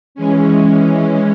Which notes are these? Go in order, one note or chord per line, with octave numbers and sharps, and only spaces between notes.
E3 G#3 C#4